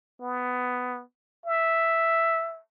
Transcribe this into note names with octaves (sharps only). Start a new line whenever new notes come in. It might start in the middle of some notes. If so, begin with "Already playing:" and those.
B3
E5